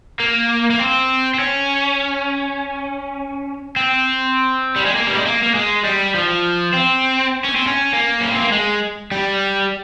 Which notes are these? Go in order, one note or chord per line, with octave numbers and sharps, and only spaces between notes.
A#3
A#3
C4
C4
C#4
C4
G3
G#3
A#3
G3
G#3
A#3
A#3
G#3
G3
F3
C4
C#4
C4
C#4
A#3
C#4
C4
A#3
G#3
G3